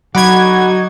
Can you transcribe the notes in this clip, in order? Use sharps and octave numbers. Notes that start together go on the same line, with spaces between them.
D3 F#3 D#4 F#4 F#5 B5 D6 G#6